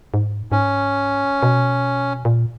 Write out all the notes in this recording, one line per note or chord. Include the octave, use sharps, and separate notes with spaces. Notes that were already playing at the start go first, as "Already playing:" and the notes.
G#2
G#2 C#4
B2
A#2